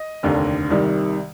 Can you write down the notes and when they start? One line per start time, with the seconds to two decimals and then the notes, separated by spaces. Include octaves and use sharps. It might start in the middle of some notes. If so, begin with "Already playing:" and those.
Already playing: D#5
0.23 F1 D#2 D3
0.71 C2 C3 D#3 G3